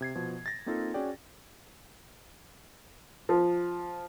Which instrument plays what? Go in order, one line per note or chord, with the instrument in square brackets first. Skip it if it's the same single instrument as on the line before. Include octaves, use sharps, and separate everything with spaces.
[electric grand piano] C3 G#6 C7
B2 F3
A6 A#6
A#3 C4 D#4 F4 A4
C#4 F#4 G#4 D5 G5
[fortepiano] F3